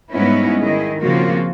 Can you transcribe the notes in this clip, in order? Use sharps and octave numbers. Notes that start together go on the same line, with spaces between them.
G#2 G3 B3 C#4 D#4 E4
D#3 E4 G#4 D#5
C#3 F3 A#3 C4 F4 F#4